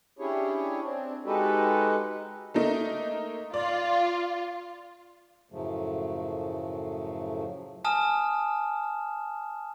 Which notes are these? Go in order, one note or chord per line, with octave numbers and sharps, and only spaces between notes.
C#4 D4 E4 G4 G#4 C#5
C4 D4
G#3 D#4 F#4 G4 A4 B4
A3 A#3 D#4
F4 D5
F#2 A2 C#3 F3 F#3 A3
G#5 A5 D#6 F6 E7